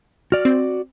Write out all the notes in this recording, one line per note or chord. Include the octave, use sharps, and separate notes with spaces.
F#4 D5 F6
C4